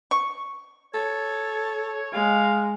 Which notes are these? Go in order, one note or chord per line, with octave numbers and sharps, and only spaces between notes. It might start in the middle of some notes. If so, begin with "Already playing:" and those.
C#6
A4 C#5
G#3 F5